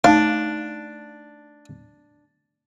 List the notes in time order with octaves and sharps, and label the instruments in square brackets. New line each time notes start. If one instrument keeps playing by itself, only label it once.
[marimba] A3 D#4 A5 [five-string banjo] D4 [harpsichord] F5